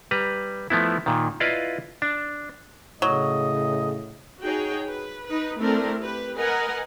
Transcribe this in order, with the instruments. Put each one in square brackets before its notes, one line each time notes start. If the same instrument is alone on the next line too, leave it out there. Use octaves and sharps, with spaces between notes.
[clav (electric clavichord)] G3 B4 A#5
F3 A3 B3 E4
A#2 D#3
E4 F4 B4 D5 D#5 F5
D4
[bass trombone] A2 [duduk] C#3 [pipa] F#3 [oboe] D#5
[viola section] D#4 F#4 G#4 C#5 G5
B4
D#4 B4
A3 C4 D4 E4 A#4
G4 B4
A#4 B4 D#5 F#5 G#5